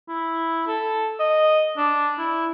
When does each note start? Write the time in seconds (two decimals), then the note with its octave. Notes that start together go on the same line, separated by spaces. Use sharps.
0.09 E4
0.67 A4
1.20 D#5
1.77 D4
2.18 E4